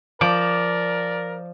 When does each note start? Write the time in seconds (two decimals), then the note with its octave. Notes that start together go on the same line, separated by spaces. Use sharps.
0.21 F3 A#4 D5 D6